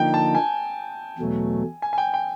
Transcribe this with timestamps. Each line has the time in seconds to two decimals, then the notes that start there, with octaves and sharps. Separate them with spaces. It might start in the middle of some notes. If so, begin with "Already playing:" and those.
Already playing: D3 F3 A#3 D#4 G5
0.14 A5
0.35 G#5
1.18 E2 B2 F#3 A3
1.82 G#5
1.93 G#5
1.98 G5
2.14 G5